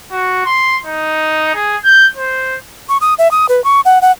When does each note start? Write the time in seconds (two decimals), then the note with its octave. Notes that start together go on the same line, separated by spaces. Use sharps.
0.12 F#4
0.46 C6
0.86 D#4
1.55 G#4
1.84 G6
2.17 C5
2.89 C#6
3.01 D#6
3.18 E5
3.31 D#6
3.49 B4
3.64 C#6
3.85 F#5
4.02 F#5